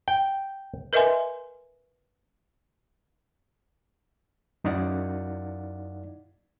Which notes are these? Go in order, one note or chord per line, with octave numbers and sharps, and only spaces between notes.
G5
A#4 B4 D#5 E5 G#5 C6
F#2 D#4 E4 D5 F5 F#5